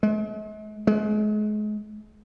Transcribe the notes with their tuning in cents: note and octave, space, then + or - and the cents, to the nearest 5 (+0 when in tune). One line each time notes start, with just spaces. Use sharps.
G#3 +45
G#3 +35